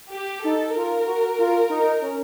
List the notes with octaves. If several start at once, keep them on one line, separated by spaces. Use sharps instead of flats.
G4
D#4 A4
F4 A#4
F#4
F4
D#4
C#4